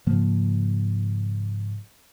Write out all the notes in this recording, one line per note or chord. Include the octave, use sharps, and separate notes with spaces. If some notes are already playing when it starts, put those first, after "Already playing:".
G#2 C#3 F3 A#3